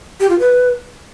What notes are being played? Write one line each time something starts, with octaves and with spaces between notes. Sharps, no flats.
G4
F4
B4